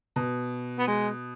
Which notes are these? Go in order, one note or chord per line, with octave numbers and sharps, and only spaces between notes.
B2
B3
G#3